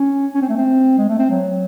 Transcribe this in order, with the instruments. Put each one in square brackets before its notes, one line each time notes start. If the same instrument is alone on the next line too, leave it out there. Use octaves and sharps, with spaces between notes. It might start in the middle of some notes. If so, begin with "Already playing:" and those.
Already playing: [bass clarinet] C#4
C#4
C4
A3
C4
G#3
A3
C4
F#3